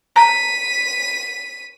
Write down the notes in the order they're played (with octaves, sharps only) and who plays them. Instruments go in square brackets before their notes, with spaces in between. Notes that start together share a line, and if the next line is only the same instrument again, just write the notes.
[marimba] A5 A#5 [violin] B6 D#7